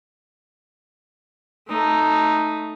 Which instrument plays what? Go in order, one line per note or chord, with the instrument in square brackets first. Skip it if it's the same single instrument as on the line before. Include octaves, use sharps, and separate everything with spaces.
[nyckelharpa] A3 D#4